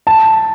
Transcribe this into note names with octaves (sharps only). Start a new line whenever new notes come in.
A5